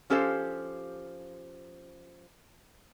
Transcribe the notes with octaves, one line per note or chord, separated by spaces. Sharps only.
F3 C#4 G4 A4 C5 F5